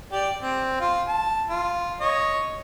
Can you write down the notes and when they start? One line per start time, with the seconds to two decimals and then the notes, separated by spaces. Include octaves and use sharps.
0.12 G4 D5
0.43 C4
0.80 F4
1.07 A5
1.50 F4
2.01 C#5 D#5